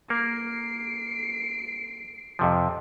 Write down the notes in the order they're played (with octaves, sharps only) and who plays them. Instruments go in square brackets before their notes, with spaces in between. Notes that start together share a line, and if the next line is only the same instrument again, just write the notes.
[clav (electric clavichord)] A#3 [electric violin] C7 D7
[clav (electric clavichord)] F2 C3 F3